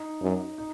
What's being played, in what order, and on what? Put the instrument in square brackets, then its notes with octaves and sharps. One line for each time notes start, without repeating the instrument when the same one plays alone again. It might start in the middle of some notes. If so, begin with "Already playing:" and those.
Already playing: [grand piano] D#4
[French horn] F#2
[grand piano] D#4